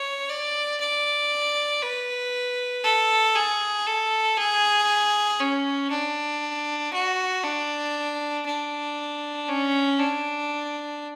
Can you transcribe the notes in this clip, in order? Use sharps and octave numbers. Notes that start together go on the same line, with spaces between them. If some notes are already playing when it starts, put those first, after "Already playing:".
Already playing: C#5
D5
D5
B4
A4
G#4
A4
G#4
C#4
D4
F#4
D4
D4
C#4
D4